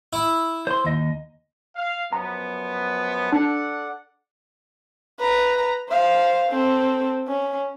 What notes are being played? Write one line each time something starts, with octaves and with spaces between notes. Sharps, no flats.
E4
C5 C6
D#2 D#5
F5
F#2 F3 B3 A#5
D4 A4 D5 F#5
B4 A#5
C5 F5
C4 A4
C#4